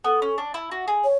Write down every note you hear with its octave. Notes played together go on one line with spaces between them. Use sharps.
B3 A4
C#4
D4
E4
F#4
G#4
C#5